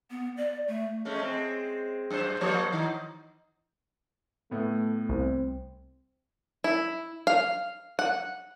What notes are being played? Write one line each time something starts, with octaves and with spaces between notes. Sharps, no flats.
B3
D5
A3
G#3 A3 C#4
G#3 C4
F#2 C5
F3 A#3 C#5
D#3 E3 D#4
A2 A3 B3
C2 C4
E4
F5
F#5